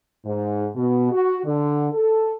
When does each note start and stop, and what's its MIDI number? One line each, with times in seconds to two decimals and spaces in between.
0.25 0.67 44
0.76 1.10 47
1.12 1.39 66
1.45 1.88 50
1.93 2.34 69